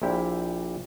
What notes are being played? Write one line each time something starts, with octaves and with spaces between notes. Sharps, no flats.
A#1 A#2 E4 G4 G5